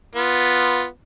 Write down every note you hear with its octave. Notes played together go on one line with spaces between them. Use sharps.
B3 F4